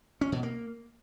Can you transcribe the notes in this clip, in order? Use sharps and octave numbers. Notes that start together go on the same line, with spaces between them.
C#4
B2
A#3